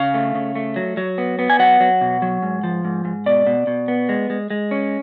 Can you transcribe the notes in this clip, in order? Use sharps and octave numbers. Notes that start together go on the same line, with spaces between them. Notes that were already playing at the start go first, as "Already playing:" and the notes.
Already playing: C#3 F5
A3
C#3
A3
F#3
F#3
B3
B3
G#5
F#3 F#5
F#3
B2
F#3
G#2
F3
G#2
G#2
B2 D5
B2
B2
B3
G#3
G#3
G#3
C#4